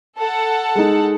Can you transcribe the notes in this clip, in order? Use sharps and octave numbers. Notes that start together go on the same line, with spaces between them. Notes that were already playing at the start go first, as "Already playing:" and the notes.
A4 F#5
G#3 D#4